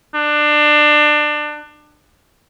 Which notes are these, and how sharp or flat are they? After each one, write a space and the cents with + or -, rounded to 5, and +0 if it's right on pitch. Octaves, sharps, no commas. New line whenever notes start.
D4 +25